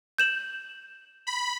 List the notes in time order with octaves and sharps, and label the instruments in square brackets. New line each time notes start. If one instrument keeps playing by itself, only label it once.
[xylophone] G6 E7 F#7
[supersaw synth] B5